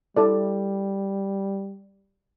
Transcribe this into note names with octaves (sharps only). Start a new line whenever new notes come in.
G3 E4 A4 D5